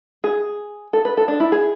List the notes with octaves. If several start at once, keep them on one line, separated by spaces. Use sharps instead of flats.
G#4
A4
B4
A4
D4
E4
G#4